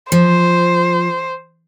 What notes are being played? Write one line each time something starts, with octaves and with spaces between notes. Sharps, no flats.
F3 C5